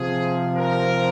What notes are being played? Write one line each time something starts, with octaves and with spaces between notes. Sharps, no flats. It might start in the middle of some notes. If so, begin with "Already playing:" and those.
Already playing: C3 F3 G#4
A#4